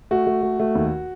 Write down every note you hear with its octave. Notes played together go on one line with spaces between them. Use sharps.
A3 F#4
A3
A3
A3
D#2